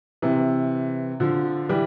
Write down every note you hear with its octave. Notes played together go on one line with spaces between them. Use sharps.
C3 E3
D3 F3
E3 G3